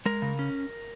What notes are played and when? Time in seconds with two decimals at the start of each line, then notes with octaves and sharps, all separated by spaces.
0.06 G#3 A#4
0.22 C#3
0.39 C#4